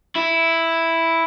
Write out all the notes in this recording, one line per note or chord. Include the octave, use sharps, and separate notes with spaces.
E4